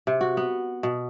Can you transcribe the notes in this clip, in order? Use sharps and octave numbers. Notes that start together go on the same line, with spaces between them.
C3
F#4
B3
B2